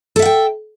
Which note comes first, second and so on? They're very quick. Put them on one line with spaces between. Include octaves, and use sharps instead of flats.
A4 E5 F#5 G5